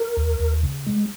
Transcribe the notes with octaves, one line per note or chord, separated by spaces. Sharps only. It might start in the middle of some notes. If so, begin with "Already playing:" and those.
Already playing: A#4
D#2
D#2
C#3
G#3